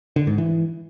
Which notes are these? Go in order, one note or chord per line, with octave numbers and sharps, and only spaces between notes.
D3
G#2
E3